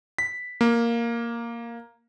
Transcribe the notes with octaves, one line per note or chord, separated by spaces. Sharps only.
B6
A#3